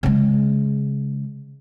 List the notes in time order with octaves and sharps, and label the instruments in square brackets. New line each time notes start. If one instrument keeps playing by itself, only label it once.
[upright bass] C#3 G#3